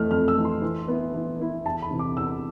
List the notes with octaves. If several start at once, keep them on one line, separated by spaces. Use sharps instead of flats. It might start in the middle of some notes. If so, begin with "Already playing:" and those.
Already playing: F2 E3 A3 F6
F2 F6
E6
E3 A3
C6
E3
B3 E4
E3
B3 E4
E2 A5
B5
C3 E3
D6
E2 E6